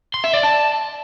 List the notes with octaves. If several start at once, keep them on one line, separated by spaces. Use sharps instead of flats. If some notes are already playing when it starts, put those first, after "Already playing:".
C6
E5
D5
A5